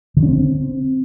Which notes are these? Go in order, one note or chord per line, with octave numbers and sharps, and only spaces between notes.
D3
C#4
C4